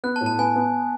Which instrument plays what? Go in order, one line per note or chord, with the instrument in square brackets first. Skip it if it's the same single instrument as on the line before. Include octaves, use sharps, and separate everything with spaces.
[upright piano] B3 [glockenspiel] F#6
[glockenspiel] A5
[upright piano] A2
[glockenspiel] A5
[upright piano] B3 [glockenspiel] G#5
[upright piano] B3